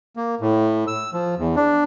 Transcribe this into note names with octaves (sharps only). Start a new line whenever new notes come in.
A#3
A2
E6
F3
E2
D4